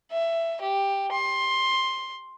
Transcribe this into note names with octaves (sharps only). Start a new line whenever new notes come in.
E5
G4
C6